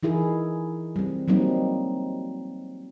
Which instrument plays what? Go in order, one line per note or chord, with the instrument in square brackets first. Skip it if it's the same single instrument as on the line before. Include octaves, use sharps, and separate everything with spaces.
[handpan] E3 D#4 E4 G#4 A#4
G3 C4
F#3 G3 A#3 C4 D#4